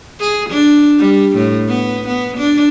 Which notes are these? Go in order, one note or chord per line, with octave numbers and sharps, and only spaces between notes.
G#4
D4
G3
A2
B3
B3
D4